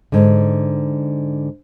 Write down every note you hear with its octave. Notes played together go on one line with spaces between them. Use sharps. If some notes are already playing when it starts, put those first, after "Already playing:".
G#2 D3